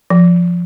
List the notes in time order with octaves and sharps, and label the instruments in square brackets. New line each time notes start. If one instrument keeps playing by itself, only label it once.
[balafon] F3